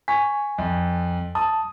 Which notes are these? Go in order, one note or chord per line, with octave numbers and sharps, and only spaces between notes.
G#5 C#6 B6
F2
A5 D#6